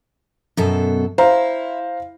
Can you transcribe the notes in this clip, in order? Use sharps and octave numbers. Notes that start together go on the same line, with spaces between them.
F#2 B2 A4
E4 C5 F5 A#5